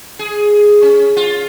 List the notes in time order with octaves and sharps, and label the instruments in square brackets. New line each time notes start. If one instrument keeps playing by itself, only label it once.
[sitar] G#4
C#4
F4